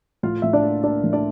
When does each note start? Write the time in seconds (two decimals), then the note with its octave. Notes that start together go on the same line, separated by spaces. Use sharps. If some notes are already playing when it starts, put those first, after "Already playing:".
0.23 A2 F4 F5
0.42 A2 E5
0.53 D4 D5
0.63 A#3
0.83 A#3 D4 D5
1.04 A2
1.13 D4 D5